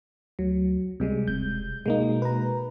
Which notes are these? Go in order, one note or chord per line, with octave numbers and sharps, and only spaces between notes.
D2 F#3
C#2 C3 G3 G#3
E1 G6
B2 G#3 A#3 D#4
B4 A#5